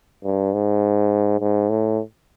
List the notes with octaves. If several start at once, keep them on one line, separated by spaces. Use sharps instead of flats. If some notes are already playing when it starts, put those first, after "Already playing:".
G2
G#2
G#2
A2